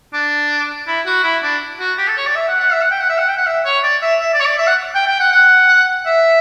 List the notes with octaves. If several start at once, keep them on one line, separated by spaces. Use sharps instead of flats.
D4
E4
F#4
E4
D4
F#4
G4
A4
C#5
D5
E5
F#5
F#5
E5
F#5
G5
F#5
E5
F#5
G5
F#5
E5
C#5
D5
E5
E5
D5
C#5
D5
E5
F#5
G5
G5
F#5
F#5
E5